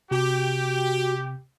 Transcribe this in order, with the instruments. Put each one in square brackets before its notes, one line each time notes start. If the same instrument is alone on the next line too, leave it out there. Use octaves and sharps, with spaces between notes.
[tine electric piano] C3 [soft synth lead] F#4 [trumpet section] G4